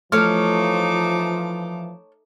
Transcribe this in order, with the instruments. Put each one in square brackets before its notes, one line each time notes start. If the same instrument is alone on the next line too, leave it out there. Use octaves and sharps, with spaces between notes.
[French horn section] E3 F3 [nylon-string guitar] A3 [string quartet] D#4 A5 D6 [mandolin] C#5 F6